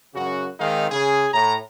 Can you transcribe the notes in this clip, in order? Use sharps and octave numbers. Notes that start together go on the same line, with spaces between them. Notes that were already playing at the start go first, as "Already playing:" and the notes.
F#2 C#3 F#4
D#3 G#3 C4 D#4 F5
C#3 G#4
A2 A#5